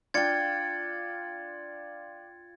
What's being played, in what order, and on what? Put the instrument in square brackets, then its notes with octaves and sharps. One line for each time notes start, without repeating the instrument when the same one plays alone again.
[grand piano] D4 [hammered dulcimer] F4 G5 [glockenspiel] G#6 A6 C#7